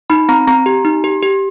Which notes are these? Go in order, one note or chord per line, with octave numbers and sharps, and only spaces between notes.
D#4 B5
C4 A#5
C4 A#5
G4
D#4
G4
G4